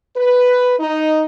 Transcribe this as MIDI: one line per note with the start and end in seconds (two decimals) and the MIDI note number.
0.17 0.75 71
0.80 1.25 63